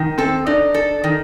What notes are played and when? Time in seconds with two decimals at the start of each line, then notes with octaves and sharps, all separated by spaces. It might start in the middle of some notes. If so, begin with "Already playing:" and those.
Already playing: D#3
0.18 C4 A4
0.46 D4 D#4
0.74 A4
1.04 D#3